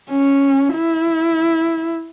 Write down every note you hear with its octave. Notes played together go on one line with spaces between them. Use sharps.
C#4
E4